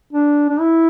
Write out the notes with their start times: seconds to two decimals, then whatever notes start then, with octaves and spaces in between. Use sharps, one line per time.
0.13 D4
0.49 D4
0.60 E4